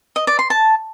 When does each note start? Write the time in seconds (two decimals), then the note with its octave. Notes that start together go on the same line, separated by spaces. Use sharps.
0.16 D#5
0.27 D5
0.39 C6
0.50 A5